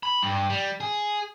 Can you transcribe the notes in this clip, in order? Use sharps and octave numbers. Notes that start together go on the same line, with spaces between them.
B5
G2
G3
G#4